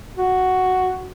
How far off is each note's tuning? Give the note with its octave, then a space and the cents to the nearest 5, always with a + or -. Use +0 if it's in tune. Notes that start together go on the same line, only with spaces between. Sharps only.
F#4 +0